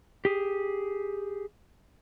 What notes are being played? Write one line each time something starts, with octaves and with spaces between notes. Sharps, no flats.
G4 G#4